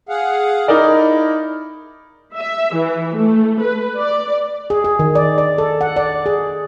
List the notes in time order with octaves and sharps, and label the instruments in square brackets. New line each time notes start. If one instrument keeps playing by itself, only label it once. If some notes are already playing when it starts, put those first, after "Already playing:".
[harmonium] G#4 F5 F#5
[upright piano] D#4 A#4 D5 [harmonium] E4
[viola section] E5
E3
A3
B4
D5
[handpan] G#4
G#4
D#3
D5
D5
A4
F#5
D5
G#4